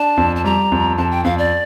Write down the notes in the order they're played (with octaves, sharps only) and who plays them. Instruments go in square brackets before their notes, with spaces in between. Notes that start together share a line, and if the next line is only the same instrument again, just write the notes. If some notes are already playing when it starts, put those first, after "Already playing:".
Already playing: [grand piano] D4 [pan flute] A5
[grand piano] F2
[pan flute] A5
[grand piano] G3 [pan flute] A#5
[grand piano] F2
[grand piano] F2 [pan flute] A5
[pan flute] G5
[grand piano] F2 [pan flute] F5
[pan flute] D5